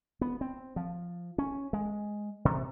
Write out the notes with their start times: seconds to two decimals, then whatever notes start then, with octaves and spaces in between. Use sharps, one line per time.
0.21 B3
0.41 C4
0.76 F3
1.38 C#4
1.73 G#3
2.45 C3